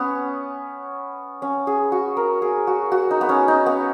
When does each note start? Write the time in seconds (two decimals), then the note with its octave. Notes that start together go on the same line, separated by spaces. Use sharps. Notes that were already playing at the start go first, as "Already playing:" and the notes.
Already playing: B3 C#4
1.42 C#4
1.67 G#4
1.92 F#4
2.17 A#4
2.42 G#4
2.67 F#4
2.92 F#4
3.11 D#4
3.21 B3
3.29 C#4
3.48 D#4
3.66 B3